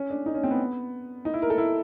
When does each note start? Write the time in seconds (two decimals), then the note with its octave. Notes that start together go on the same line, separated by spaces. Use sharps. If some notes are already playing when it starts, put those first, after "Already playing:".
Already playing: C#4
0.10 D4
0.26 D#4
0.34 C#4
0.44 C4
0.51 B3
1.25 D#4
1.34 E4
1.42 A#4
1.50 A4
1.58 E4